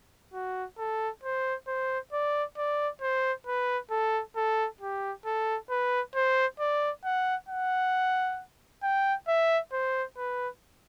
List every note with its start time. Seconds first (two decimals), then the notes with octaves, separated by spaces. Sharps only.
0.34 F#4
0.78 A4
1.24 C5
1.68 C5
2.13 D5
2.58 D5
3.01 C5
3.47 B4
3.91 A4
4.36 A4
4.81 G4
5.26 A4
5.70 B4
6.15 C5
6.59 D5
7.05 F#5
7.49 F#5
8.83 G5
9.28 E5
9.73 C5
10.17 B4